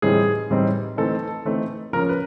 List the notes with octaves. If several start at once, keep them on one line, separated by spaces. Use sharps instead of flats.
A2 E3 G3 C4 D#4 G#4
A2 E3 G3 C4 D#4
E3 A3 C4 D#4 A4
E3 A3 C4 D#4
C#3 F3 A#3 C#4 A#4
B4